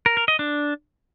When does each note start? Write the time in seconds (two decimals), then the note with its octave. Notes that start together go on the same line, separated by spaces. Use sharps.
0.06 A#4
0.17 A#4
0.28 D#5
0.39 D4